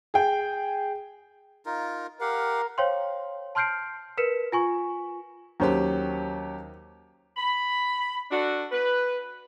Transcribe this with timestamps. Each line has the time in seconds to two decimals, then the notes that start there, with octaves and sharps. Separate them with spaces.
0.14 G#4 G5
1.66 D#4 F4 A#4
2.21 G4 A#4 F5 F#5
2.78 C5 C#5 F5 G5 C6
3.55 A5 C6 F6 G6 C7 D7
4.17 A#4 B4 B6 C#7 E7
4.52 F4 G#5 C#6
5.60 D#2 F#3 C#4 G4 C5
7.37 B5
8.31 D4 F#4 A4
8.72 B4